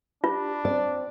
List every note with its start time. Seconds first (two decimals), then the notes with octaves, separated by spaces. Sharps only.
0.24 D4 F4 G4
0.65 C4 D5